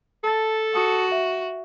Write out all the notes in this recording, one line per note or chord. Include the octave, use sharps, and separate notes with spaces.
A4 A5 A6
F#4 A5 D#6 C#7
E5